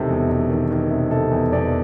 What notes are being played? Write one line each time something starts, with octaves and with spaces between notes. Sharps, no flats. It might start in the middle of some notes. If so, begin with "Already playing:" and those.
Already playing: E1 C3 D#3 A4
E2
E1
D#3
D#3
C3
C3 A4
E2
E2 D5